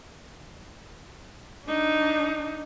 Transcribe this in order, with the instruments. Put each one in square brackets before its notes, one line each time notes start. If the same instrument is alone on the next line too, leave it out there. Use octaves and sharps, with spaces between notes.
[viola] D4 D#4